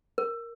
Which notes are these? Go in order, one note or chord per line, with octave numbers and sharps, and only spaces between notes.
A#4